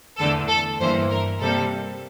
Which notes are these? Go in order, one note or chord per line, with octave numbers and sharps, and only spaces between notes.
E2 D3 A3 A4
A4
G2 E3 A#3 C5
A#4
C3 G3 A#3 A4